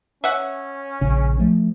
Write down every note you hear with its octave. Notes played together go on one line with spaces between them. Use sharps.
C#4 E5 F#5
A#1 C#3
F3 A3